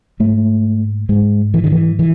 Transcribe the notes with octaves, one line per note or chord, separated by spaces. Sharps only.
G#2 A3
G#2 G#3
E3
D#3
E3
E3